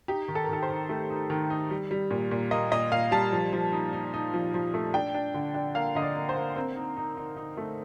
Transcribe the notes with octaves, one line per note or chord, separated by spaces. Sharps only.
D#4 G4
D#3
A4
A#4
D#3 A4
C5
D#3
A3
D#4
D#3
D#4
G3
G3
A#2
A#2
A#3 D#5
A#2 D#5
A#2 F5
G3 A5
F3
F3
D#4
D#4
D#4
F3
F3
A3
D4 G5
D4
D3
D4
A#3 F5
D3 D#5
D5
A#3
C5
A#3
C4 A#4
D#4
D#4
D#4
D#4
A3